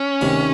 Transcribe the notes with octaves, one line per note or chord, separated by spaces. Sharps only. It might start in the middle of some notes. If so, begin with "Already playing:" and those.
Already playing: C#4
D2 C3 D#3